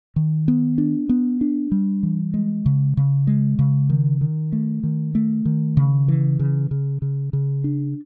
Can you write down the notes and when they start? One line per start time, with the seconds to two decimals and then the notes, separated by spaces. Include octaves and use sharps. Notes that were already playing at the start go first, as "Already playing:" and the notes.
0.16 D#3
0.48 B3
0.78 D4
1.09 B3
1.41 D4
1.72 G3
2.03 E3
2.34 G#3
2.66 C#3
2.97 C#3
3.27 G#3
3.59 C#3
3.90 D#3
4.21 D#3
4.52 A3
4.83 D#3
5.15 A3
5.45 D#3
5.77 C#3
6.08 E3
6.39 C#3
6.71 C#3
7.02 C#3
7.33 C#3
7.64 D4